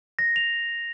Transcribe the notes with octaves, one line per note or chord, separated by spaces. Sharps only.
A#6
F7